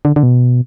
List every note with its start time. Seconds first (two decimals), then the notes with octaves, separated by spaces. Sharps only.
0.05 D3
0.16 D3
0.23 B2